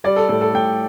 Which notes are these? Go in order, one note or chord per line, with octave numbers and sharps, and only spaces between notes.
G3 D5
A4
A2 A4
A4
A2 G5